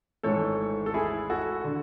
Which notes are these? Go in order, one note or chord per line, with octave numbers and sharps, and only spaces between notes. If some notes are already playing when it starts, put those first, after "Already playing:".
G#1 G#2 E3 A3 A4 C#5
A4
E4 G#4
F#4 A4
D3